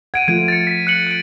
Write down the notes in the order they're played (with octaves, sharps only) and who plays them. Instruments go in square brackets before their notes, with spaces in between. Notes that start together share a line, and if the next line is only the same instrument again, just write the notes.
[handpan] F#5 [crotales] G#6 D7 D#7
[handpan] F3 A3 F4 [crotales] G#6 D7
[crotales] A6 C#7
B6
F#6 C#7 F#7
F#6 D7